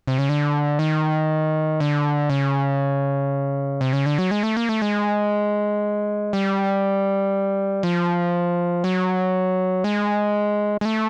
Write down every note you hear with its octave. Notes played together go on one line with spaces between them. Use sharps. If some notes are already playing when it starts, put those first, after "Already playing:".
C3
C#3
D3
D#3
D3
C#3
C3
C#3
D3
F#3
G#3
A3
A#3
A3
G#3
G3
F3
F#3
G#3
G#3
A3